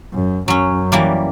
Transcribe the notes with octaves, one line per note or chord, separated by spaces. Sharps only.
F#2
F#2 F#3 C#4
E3 G3 A#3